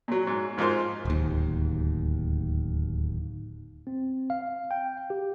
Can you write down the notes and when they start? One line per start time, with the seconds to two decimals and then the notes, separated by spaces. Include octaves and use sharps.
0.08 A#2 F#3
0.27 G#2
0.57 F2 G#2 F3 A#4 C5
1.05 D1 D#2
3.87 C4
4.30 F5
4.71 G5
5.10 G4